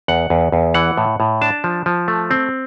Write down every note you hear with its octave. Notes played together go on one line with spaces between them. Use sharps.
E2 F#5
E2
E2
E3 F#5
A2
A2
D4 A5
F3
F3
A3
C4